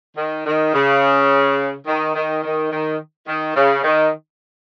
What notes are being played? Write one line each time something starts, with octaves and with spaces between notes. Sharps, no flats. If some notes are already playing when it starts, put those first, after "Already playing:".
D#3
D#3
C#3
D#3
D#3
D#3
D#3
D#3
C#3
D#3